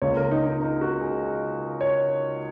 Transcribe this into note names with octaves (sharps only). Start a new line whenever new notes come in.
C#2 C#3 A#3 C#5
A#4
D#4
D#4
D#4
F#4
G#4
C#5